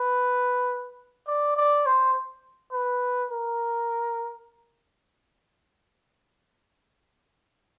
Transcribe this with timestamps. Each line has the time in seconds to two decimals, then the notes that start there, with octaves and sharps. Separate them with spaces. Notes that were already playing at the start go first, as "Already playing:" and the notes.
Already playing: B4
1.28 D5
1.57 D5
1.86 C5
2.72 B4
3.31 A#4